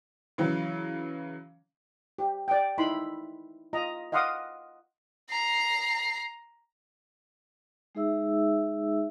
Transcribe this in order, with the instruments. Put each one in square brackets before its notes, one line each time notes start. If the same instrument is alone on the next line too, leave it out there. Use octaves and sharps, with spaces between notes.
[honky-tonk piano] C#3 E3 F#3
[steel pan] G4
D5 G5
D#4 E4 B5 C6
F4 D#5 A#5
D#5 F5 F#5 C6 D6 D#6
[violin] A#5 C7
[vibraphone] G#3 D#4 G#4 E5 E6